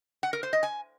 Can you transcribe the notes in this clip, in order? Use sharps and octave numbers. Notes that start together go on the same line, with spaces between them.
F#5
A#4
C5
D#5
G#5